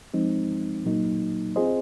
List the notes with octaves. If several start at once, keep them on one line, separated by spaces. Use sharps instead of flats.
F3 G#3 C4 D#4
A#2 F#3 A#3 D#4
C4 F4 G#4 C5 D#5